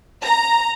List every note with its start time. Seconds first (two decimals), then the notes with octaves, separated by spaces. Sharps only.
0.23 A#5